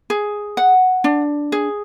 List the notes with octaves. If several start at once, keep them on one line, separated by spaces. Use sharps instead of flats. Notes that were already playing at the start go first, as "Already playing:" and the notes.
G#4
F#5
D4
G#4